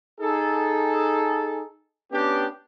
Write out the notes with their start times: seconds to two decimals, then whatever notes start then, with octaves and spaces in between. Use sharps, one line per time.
0.21 D#4 G#4 A4
2.12 B3 C#4 D4 G4